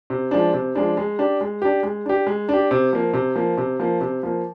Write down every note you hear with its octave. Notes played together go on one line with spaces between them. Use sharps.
C3
F3 G#3 D4
C3
F3 G#3 D4
G#3
D4 G4
G#3
D4 G4
G#3
D4 G4
G#3
D4 G4
C3
F3 A#3
C3
F3 A#3
C3
F3 A#3
C3
F3 A#3